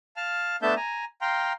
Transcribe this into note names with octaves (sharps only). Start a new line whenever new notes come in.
F5 A5 F6
A3 B3 D4 E5 A5 G6
G#5 A#5
F5 G5 A#5 C6